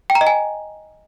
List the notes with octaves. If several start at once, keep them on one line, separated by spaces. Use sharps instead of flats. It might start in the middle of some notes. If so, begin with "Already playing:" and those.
G5
A#5
D#5
G#5